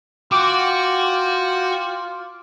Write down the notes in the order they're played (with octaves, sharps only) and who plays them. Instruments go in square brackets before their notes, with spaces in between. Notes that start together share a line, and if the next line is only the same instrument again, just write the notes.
[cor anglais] F4 [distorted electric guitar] F#4 [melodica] G5 [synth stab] D6